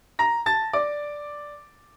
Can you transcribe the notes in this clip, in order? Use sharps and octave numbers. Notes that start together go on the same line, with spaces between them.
A#5 A#6
A5 A6
D5 D6